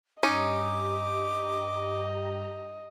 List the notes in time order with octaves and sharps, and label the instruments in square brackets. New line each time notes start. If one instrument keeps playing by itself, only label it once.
[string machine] G2 G4 A#5 [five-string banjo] C#4 D#4 [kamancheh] D#5 [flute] D6